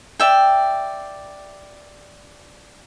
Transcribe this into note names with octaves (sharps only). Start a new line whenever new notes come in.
D5 E5 G5